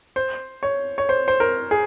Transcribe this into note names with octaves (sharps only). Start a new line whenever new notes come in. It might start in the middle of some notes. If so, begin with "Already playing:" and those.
C5
C#5
C#5
C5
C5
A#4
G#4